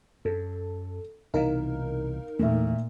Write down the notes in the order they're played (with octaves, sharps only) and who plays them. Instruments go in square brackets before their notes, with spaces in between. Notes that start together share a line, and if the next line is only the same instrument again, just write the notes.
[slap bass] F#2 [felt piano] A4
[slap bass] C2 B2 E3 [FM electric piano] D#4 A#4 [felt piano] F5
[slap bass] E2 [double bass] A#2 [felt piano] A3 E5